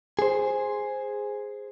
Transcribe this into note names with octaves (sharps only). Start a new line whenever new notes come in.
G#4 C5